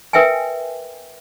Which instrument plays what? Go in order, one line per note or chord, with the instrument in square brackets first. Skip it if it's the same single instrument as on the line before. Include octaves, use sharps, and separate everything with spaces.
[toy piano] A#4 B4 E5 G5 G#5